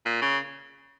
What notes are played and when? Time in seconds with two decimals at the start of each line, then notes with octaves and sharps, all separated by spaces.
0.05 A#2
0.21 C#3